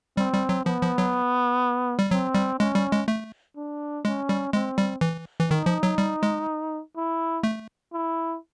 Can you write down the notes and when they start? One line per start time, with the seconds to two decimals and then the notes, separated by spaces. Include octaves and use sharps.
0.17 G3 C4
0.33 G3
0.49 F#3
0.65 F3 B3
0.82 F3
0.98 F#3
1.99 G3
2.11 F#3 C4
2.35 G3
2.59 G#3 C#4
2.75 G3
2.92 G#3
3.08 A3
3.57 D4
4.05 G#3 C#4
4.29 G3
4.53 G#3 C4
4.78 G3
5.01 E3
5.39 E3
5.50 D#3 D#4
5.66 F3
5.83 F#3
5.98 G3
6.23 G#3
6.96 E4
7.43 A3
7.93 E4